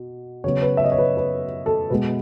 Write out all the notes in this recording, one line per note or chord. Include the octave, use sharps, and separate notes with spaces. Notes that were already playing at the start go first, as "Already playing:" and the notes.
Already playing: B2
C#3 F#3 B3 C#5
B4
E5
D#5
C#5
B4
B4
A4
B2 G#3 B3 B4